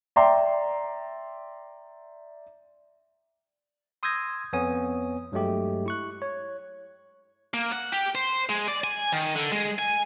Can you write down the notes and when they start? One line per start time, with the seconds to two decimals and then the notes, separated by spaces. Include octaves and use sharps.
0.16 D5 E5 G5 A#5 C6 D6
4.03 C6 D#6 E6 G6 G#6 A#6
4.53 F2 B3 C#5 G#5 D#6
5.32 G2 F#3 G#3 A3 G4
5.86 E4 C#6 F#6
6.22 C#5
7.54 A#3
7.72 F#5
7.92 G4
8.15 C5
8.49 G#3
8.68 D5
8.84 G#5
9.13 D#3
9.36 D3
9.52 G#3
9.79 G#5